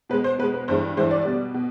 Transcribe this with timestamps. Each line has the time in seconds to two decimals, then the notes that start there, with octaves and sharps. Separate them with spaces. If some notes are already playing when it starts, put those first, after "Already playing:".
0.09 B2 G#3 B4
0.24 C5
0.38 B2 B4
0.43 G#3
0.54 B4
0.68 G2 E3 G#3 C5
0.97 G2 E3 G#3 C5
1.11 D5
1.25 B2 G3
1.54 B2